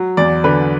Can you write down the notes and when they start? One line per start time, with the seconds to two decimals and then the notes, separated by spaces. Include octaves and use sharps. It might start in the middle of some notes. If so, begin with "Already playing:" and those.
Already playing: F#3
0.17 E2 D5
0.44 D3 B4